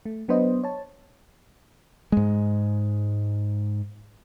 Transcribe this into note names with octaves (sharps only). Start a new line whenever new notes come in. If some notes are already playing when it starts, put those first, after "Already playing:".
A3
F#3 B3 D4 B4 C5 D#5
C#5 A5
G#2 G#3